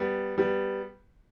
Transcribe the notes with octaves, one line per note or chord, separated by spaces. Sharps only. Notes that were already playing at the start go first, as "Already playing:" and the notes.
Already playing: G3 B3
G3 B3